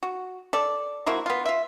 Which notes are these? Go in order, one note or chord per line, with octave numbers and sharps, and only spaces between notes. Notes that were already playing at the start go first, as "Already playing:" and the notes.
F#4
A4 D5
F3 A#3 E4 F#4
B3 F4
F4 E5